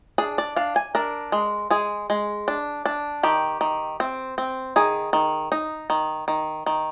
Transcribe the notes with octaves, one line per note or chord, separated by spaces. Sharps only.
D4 G#4
D5
D4 F5
G#5
D4 A#4
G#3
G#3 G#4
G#3
D4
D4
D#3 G4
D#3
C4
C4
D#3 G#4
D#3
D#4
D#3
D#3
D#3